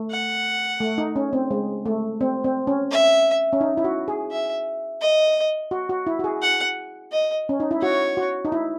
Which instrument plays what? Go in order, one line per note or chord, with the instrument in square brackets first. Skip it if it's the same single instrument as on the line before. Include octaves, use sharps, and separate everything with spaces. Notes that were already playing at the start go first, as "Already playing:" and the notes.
Already playing: [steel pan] A3
[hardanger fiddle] F#5
[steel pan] A3
D#4
C#4
C4
G#3
A3
C4
C4
C#4
[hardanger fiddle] E5
[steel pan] C#4
D#4
E4
F#4
G#4
[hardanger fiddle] E5
D#5
[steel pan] F#4
F#4
E4
F#4
G#4
[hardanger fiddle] F#5
D#5
[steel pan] C#4
D#4
E4
[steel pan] F#4 [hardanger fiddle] C#5
[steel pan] F#4
D#4
E4